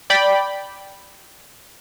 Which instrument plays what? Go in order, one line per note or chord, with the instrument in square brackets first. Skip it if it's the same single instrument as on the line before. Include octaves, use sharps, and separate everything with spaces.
[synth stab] D5 G5 B5